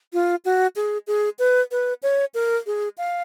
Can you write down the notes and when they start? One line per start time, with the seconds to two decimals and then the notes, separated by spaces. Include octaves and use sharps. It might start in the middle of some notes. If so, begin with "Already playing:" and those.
0.13 F4
0.45 F#4
0.76 G#4
1.07 G#4
1.39 B4
1.71 B4
2.03 C#5
2.34 A#4
2.66 G#4
2.98 F5